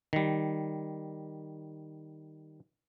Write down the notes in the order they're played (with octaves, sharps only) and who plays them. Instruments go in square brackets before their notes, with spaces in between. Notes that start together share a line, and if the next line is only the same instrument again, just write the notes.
[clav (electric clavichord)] D#3 G3